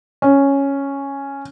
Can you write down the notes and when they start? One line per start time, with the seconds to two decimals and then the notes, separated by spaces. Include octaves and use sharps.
0.22 C#4